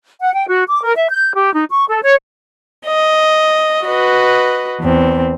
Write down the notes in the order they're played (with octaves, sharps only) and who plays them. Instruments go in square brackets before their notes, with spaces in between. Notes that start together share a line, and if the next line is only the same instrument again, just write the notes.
[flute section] F#5
G5
F#4
D6
A#4
E5
G6
G4
D#4
C#6
A4
C#5
[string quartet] D#5
F#4 B4 D#5
E2 C4